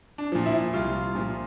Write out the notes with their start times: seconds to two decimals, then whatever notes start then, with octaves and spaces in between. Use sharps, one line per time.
0.18 D4
0.32 A#2 F3
0.46 E4
0.73 C2 F4
1.15 A#2 F3